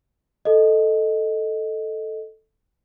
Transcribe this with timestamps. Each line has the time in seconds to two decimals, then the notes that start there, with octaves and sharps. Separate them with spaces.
0.45 A4 D#5